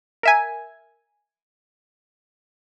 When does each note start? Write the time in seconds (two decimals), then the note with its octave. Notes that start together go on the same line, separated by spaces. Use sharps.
0.23 A#4 E5 G#5